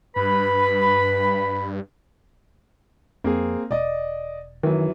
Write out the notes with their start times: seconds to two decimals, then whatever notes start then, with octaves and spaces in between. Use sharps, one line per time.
0.16 G2 B4 B5
3.24 F2 A#3 C4 G#4
3.71 E1 D5 D#5
4.63 F#2 D#3 E3